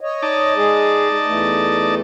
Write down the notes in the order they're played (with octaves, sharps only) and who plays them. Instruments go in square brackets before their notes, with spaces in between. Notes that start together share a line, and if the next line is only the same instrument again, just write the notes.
[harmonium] C#5 D#5
[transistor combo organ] D#4 D5 A5
[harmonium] G#3 G#4
E2 E3 A3